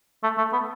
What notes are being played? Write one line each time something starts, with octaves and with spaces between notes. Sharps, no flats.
A3
A3
B3